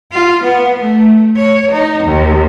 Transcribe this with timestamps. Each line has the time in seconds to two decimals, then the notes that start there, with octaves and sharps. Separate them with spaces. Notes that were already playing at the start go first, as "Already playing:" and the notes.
0.12 F4
0.44 B3
0.80 A3
1.36 C#5
1.72 D#4
2.04 D#2